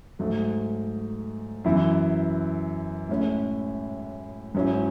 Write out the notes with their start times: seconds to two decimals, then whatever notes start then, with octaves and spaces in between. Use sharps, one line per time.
0.19 G#2 F#3 A3
1.64 F#2 E3 B3 E4
3.09 A2 G#3 C#4
4.54 G#2 F#3 C#4 E4